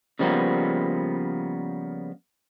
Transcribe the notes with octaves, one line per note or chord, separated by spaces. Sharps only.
C#3 F3 G3 A#3 B3